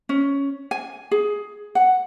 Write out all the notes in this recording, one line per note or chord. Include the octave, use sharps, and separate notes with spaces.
C#4
G#5
G#4
F#5